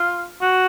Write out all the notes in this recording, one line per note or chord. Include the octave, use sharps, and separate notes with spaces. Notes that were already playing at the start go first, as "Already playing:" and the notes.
Already playing: F4
F#4